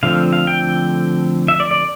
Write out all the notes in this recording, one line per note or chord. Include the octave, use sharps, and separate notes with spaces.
D3 F3 A3 C4 F5
F5
G5
E5
D5
D5